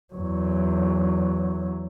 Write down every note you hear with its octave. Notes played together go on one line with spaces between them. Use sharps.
E2 F#3